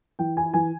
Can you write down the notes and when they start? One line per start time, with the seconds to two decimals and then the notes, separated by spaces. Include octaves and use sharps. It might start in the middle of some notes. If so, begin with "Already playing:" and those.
0.19 E3 G5
0.37 E4 G#5
0.54 E3 G#5